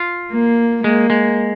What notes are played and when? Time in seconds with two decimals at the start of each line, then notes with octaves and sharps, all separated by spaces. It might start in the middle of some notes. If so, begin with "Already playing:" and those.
Already playing: F4
0.33 A#3
0.84 G#3 A#3
1.10 G#3